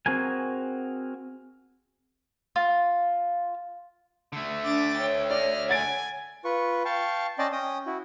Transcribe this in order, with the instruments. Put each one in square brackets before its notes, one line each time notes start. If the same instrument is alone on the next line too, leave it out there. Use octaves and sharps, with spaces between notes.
[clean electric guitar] C4 F#4 G#4 A#4 G#5
[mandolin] F4
[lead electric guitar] D3 A3
[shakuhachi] D4 [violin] D6 A6
[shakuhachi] C#5 [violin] G5
[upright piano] D5 [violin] D#5 F6
[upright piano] F#5 A6 D7 [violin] G#5 G#6
[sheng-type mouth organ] F4 B4 C#6
F5 G5 A5 C#6
C#4 D5 D#5 G5 A5 C6
C#4 G5 D#6
E4 F#4